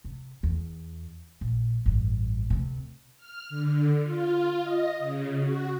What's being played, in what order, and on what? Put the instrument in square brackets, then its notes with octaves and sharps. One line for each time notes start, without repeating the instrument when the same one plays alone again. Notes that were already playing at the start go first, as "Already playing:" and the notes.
[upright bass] C3
E2
A#1
A1 G2
D2 C3
[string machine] F6
D3
F4
D#5
C#3
F#4